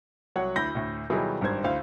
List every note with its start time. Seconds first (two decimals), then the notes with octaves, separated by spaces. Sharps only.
0.36 C2 F#3 C#5 F#5
0.56 D2 E4 B5 G6 A#6
0.75 D2 A2
1.10 B2 D#3 F#3 G3 E4 G#4
1.41 G#1 G2 G3 C5 G#6
1.64 D2 E4 C5 F5